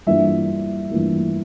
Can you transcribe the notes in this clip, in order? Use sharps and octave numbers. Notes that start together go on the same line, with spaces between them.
G2 E3 A#3 F4 E5
G2 E3 A#3 F4